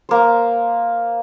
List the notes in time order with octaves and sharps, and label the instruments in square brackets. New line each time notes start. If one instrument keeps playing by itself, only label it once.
[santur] A#3 C5